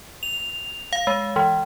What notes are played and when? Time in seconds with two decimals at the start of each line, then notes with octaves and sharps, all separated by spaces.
0.23 F7
0.93 F5
1.07 G#3
1.36 E3